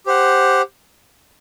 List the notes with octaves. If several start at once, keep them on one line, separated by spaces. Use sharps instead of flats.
G4 C5 F#5